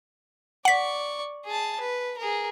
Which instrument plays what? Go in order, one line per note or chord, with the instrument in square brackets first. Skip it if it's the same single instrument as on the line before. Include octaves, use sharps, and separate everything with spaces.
[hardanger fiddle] D5 C#6 [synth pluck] F#5 B6
[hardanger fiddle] G#4 A5
B4
G#4 A#4